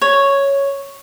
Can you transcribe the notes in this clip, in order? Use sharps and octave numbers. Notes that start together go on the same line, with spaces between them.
C#5